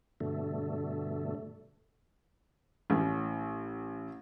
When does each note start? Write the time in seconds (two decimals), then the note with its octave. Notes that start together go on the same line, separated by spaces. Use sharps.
0.20 G2 B2 D3 A3
2.90 A1